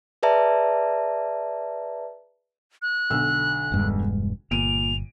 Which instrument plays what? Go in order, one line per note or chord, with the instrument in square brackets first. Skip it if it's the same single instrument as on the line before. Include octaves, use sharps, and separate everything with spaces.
[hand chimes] G#4 B4 D5 E5 A5 A#5
[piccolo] F#6
[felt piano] B1 D3 E6
[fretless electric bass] E1 G2 G#3
[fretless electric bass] G1 [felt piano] A#2 D7 D#7 [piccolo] F7